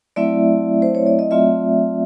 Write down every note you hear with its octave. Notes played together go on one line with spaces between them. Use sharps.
F#3 A3 C4 E4 D5 E5
C5
C#5
D5
D#5
F#3 A3 C4 F4 D5 E5